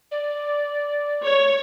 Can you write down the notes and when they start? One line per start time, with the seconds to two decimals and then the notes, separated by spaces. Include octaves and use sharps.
0.11 D5
1.24 C#5